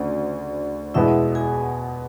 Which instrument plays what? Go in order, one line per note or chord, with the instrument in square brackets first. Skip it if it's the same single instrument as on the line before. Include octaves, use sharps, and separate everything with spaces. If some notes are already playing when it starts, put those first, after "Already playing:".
Already playing: [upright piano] D2 C#3 [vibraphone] D4 D5
[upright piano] E2 B2 G#3 B3 [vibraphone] E4 E5
[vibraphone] G#4 G#5